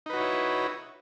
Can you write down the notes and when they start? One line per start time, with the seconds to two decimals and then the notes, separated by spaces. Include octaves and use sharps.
0.06 D#4
0.10 B4
0.13 F#4
0.17 C#5
0.20 E4